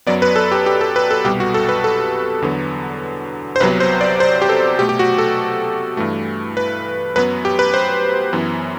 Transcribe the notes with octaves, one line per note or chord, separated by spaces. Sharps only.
F#2 F#3 B3 D5
B4
A4
G4
G4
A4
B4
A4
C2 B2 G3 G4
F#4
A4
B4
A4
E2 D3 F#3 B3
C5
C2 C3 F#3 B3 B4
C5
D5
C5
G4
A4
B2 A3 G4
G4
F#4
A4
G2 E3 A3
B4
F#2 F#3 B3 B4
G4
B4
C5
F#2 E3 B3